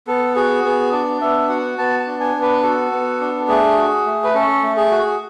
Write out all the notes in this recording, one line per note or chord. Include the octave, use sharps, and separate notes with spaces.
B3 A4
F#4 G#4
B3 G#4
D4 D5
B3 E5
F#4 F#5
B3 A5
A5
D4
G#5
B3
B4
F#4 A4
B3
D4
A3 G#4
F#4
A3
B4
C#4 A4
A3
G#4
F#4